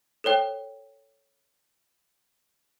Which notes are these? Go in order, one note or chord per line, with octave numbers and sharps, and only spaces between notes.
A4 C5 C#5 G5